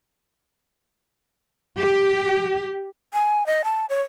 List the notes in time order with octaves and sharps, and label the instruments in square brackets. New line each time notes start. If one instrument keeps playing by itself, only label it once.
[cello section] G4
[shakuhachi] G#5
D#5
A5
C#5